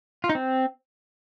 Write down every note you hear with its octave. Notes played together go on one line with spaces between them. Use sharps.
F4
D#4
C4